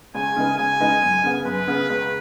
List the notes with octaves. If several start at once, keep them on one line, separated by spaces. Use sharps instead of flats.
C#2 G#5
C#3 G#3 D#4 B4
C#2 G#5
C#3 G#3 D#4 B4
F#2
C#3 B3
F#2 B4
C#3 B3
C#2